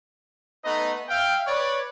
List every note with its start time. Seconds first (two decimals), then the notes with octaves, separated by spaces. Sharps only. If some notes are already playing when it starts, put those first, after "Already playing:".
0.65 A3 B3 D#4 B4 D#5
1.09 E5 F5 G5
1.47 B4 C#5 D5